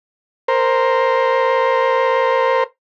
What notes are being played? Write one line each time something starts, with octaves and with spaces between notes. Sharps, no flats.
A#4 C5